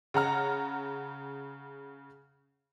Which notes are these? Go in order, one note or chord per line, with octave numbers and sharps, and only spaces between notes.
C#3 F#5 A#5 F6